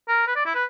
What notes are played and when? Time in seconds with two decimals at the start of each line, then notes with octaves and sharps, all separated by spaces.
0.08 A#4
0.27 B4
0.36 D5
0.46 E4
0.55 B4